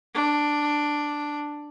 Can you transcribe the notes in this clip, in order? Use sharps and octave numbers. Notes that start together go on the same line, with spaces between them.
D4